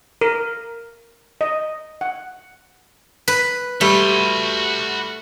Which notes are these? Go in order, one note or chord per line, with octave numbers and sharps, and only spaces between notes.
A#4
D#5
F#5
B4
G3 A3 F#4 C6